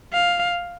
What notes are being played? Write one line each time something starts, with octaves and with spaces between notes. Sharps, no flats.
F5